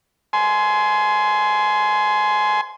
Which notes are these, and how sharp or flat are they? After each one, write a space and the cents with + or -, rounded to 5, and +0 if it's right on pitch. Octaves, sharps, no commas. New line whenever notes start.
G#5 +25 C6 -10